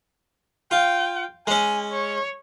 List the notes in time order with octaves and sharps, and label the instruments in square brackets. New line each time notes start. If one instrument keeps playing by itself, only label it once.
[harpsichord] F4 [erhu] G5
[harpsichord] G#3 C#4 [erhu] G#5
[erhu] C#5